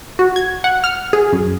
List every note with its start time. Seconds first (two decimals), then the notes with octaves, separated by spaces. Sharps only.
0.19 F#4
0.36 G#6
0.64 F#5
0.84 F6
1.13 G#4
1.33 F#2